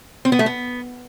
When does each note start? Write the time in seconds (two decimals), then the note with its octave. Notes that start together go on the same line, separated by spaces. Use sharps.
0.25 C4
0.32 B3
0.39 A3
0.46 B3